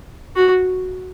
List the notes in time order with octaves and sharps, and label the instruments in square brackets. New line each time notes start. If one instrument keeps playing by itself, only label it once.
[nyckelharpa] F#4